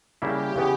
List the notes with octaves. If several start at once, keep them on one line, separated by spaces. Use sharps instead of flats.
C#3 G3 A#3 E4 G4
C#3 E3 B3